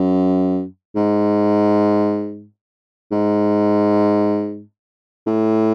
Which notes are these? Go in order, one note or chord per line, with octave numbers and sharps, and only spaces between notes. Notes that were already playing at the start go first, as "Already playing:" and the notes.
Already playing: F#2
G#2
G#2
A2